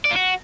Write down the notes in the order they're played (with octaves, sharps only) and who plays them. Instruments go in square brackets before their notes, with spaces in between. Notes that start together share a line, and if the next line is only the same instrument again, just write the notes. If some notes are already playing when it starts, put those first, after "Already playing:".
[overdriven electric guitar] D5
F4
F#4